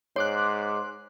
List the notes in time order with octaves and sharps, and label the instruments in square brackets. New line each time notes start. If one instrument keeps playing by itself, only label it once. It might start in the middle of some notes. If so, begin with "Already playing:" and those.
[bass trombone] G#2 [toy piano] C#5 [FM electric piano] C6 D6 F#6